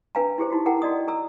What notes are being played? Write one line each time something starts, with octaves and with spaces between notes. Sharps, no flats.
D4 B4 F5 G#5 A#5
E4 G4 G#4 C5
D#4 E4 F#4 G4
E4 G#4 A#4 F#5 G5 A#5
F#4 D5 D#5 D#6
A4 A#5 E6